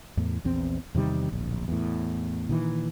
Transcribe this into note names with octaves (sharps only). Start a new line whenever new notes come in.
E2 A2
A#1 E2 C4
E2 C3 D#3 G3
D1 A#1
E2 A2
A#2 D#3 E3